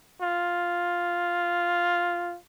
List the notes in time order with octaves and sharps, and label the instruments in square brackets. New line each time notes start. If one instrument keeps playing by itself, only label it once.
[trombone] F4